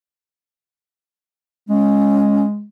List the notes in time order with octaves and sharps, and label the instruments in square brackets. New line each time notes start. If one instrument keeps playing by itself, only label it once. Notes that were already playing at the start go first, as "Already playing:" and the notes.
[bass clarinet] G#3 [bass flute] C#4